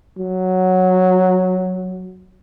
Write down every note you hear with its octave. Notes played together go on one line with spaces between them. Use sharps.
F#3